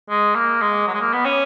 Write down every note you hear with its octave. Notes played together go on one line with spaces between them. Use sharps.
G#3
A#3
G#3
F#3
G#3
A#3
B3
C#4